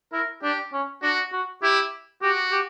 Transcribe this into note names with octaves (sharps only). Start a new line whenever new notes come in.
E4 A#4
D4 G4
C#4
D4 F#4
F#4
E4 G4
F#4 G4
G4